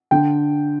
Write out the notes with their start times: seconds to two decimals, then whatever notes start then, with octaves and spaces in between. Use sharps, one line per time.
0.11 D3 G5